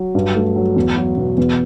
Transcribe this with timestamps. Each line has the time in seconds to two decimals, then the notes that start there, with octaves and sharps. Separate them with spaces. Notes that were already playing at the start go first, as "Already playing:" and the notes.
Already playing: F#3
0.15 G2
0.35 A3
0.56 F#3
0.76 E2
0.97 F#3
1.17 B2
1.38 E2